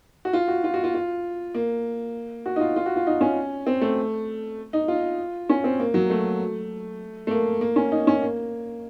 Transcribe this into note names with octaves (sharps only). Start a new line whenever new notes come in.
F#4
F4
F#4
F4
F#4
F4
F4
A#3
F#4
D#4
F4
F4
F#4
F4
D#4
C#4
C4
A3
D#4
F4
C#4
C4
A#3
F#3
A3
A3
A#3
A#3
C#4
D#4
C#4
A#3